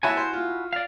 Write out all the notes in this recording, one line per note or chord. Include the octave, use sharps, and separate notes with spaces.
E4 F#4 C#5 E5 G#5 A5
C5
F4
D5 F5